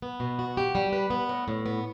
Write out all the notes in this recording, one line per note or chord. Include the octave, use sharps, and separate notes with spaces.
B3
B2
F#4
G4
G3
B4
B3
A2
A2
B3